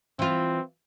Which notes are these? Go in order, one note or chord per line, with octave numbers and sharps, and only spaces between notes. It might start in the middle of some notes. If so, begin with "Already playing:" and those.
E3 C4 F4